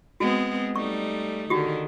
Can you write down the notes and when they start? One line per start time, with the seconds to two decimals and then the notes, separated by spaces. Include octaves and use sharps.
0.20 G#3 B3 C4 F#4
0.76 G3 A3 D#4 C#6
1.50 D3 D#3 F#4 G4